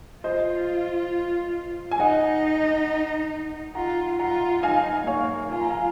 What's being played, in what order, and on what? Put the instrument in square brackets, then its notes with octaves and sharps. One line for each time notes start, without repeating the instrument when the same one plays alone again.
[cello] F4 [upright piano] C5 D#5
[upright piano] G#5
[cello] D#4 [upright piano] D#5 F#5
[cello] F4 [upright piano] F#5 A#5
[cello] F4 [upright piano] F#5 A#5
[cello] D#4 [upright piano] F5 G#5
[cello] A#3 [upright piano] C#5 F5
[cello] F4 [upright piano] G#5
[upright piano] A#5
F5 G#5